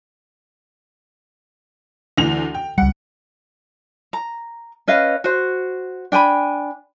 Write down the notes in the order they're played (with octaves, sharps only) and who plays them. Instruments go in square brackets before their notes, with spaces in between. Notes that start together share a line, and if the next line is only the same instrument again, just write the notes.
[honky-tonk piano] D2 E3 F7
G5
[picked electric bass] C#2 G3 [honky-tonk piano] F#5
[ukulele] A#5
C#4 B4 D#5 F5
F#4 C5
D4 G5 G#5 B5